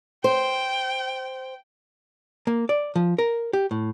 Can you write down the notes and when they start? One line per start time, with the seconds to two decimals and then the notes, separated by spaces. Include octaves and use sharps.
0.24 C5 G5
2.47 A#3
2.69 D5
2.96 F3
3.18 A#4
3.53 G4
3.71 A2